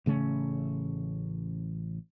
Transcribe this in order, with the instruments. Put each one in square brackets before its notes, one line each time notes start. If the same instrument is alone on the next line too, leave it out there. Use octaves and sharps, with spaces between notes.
[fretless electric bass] A1 C#3 A3 C#4